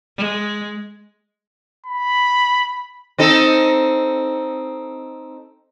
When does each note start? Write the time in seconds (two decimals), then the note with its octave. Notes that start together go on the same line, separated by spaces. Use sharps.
0.17 G#3
1.87 B5
3.18 C4 D#4 A4